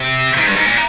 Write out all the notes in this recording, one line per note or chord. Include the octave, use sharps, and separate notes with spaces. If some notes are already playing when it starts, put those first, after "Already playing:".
Already playing: C3
G#2
G2
G#2
A#2